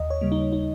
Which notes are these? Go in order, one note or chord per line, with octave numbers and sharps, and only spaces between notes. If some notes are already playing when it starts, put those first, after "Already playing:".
Already playing: D#2 D#5
C#5
C#3 G3 A#3
D#4
D#4